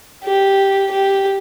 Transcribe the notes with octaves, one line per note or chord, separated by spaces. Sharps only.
G4
G4